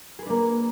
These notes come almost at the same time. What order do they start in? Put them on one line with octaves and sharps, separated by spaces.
G#4 B4 D4 A#3